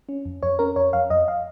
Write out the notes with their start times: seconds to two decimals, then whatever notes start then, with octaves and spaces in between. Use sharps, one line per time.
0.09 C#4
0.25 F2
0.43 F2 C#5
0.59 C#4 A#4
0.76 F2 C#5
0.93 F2 F5
1.10 F2 D#5
1.28 F5